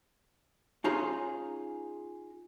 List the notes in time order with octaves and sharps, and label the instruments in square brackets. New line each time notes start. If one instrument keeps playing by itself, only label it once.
[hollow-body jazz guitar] C#4 D#4 F4 G#4 C#5 A#5